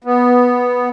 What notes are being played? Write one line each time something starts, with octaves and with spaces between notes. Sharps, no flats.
B3